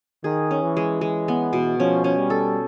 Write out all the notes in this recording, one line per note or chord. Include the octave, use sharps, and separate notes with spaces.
D#3 G#4
C#4
E3
G#3
G#3
B3
B2
F3 C#4
C#4
G3
A4